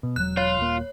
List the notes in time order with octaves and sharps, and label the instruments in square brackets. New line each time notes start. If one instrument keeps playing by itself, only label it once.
[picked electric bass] B2
[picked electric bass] E1 F#3 [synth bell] F#6
[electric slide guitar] F4 [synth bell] C#5
[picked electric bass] D#1 A#3